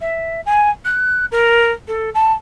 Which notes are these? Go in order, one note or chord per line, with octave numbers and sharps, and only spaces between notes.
E5
G#5
F#6
A#4
A4
A5